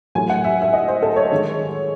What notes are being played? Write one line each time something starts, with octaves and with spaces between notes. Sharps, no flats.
A2 F#3 A3 G#5
F#5
E5
E5
D#5
C5
A4
C#5
D#3 G#3